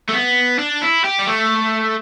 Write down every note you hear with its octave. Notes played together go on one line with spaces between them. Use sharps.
A3
B3
D4
E4
G4
G3
A3